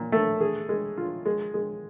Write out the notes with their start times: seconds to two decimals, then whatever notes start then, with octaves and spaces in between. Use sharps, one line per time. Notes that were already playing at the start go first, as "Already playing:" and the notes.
Already playing: A#2
0.12 A3
0.41 G#4
0.69 G#3
0.98 F4
1.26 G#3
1.54 G#3